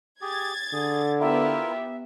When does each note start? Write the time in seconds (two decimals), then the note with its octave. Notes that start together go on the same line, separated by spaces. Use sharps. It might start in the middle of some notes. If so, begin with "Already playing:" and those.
0.22 G4 G#4 G#6 A6
0.73 D3 G#4
1.20 B3 E4 F4 G4 A#4 E5